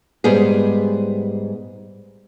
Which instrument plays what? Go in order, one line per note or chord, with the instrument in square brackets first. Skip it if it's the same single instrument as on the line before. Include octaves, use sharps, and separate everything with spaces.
[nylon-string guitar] G#2 G3 B3 G#4